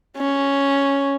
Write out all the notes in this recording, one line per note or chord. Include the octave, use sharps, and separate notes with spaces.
C#4